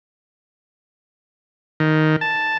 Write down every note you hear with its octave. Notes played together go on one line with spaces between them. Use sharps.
D#3
A5